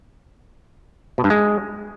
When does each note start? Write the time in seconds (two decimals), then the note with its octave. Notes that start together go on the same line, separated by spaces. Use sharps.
1.18 B2
1.24 G2
1.30 G#3